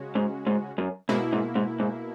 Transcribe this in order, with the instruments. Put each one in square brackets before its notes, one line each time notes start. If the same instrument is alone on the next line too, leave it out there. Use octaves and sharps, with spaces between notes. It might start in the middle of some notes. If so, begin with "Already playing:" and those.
Already playing: [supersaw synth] C#3 G#3 C#4 F#4
[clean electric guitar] G#2
G#2
F#2
[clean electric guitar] G#2 [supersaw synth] B2 A#3 E4
[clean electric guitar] G#2
G#2
G#2